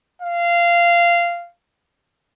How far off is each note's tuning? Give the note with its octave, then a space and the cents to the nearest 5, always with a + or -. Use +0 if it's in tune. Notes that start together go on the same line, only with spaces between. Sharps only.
F5 -15